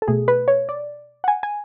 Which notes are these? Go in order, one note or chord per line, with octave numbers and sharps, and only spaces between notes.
A4
B2 A3 G#4
B4
C#5
D5
F#5
G#5
G#5